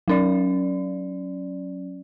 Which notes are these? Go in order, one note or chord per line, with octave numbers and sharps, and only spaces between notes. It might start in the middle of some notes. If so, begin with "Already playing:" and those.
F#3 C#4 D5